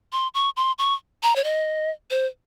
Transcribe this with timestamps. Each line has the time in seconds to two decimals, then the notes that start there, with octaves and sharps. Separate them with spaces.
0.12 C6
0.34 C#6
0.57 C6
0.79 C#6
1.23 A#5
1.36 C#5
1.44 D#5
2.11 C5